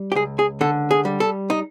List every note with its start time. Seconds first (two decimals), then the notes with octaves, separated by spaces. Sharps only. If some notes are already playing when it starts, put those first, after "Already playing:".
Already playing: G3
0.12 G4
0.15 C#2 G#4
0.39 G#4
0.61 D3 A4
0.91 G#4
1.05 G3
1.20 A4
1.50 D#4